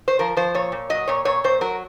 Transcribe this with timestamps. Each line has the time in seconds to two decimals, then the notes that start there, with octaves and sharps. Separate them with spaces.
0.08 C5
0.19 F3 A#4
0.37 F3 C5
0.54 A#2 C#5
0.72 A#2
0.90 F#3 D#5
1.08 A#2 C#5
1.25 A#2 C#5
1.44 A#2 C5
1.61 F#3 A#4